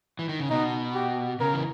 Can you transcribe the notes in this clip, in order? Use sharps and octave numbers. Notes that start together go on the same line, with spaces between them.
E3
D#3
C#3
B2 D#4
G4
C#3 A#4
E3